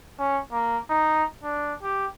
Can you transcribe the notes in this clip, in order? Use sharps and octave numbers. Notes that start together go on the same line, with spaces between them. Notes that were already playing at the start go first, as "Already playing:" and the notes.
C#4
A#3
D#4
D4
G4